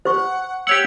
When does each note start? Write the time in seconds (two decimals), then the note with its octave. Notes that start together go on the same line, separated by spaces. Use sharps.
0.05 C5 F#5 C#6
0.67 G4 C#5 F#5 E6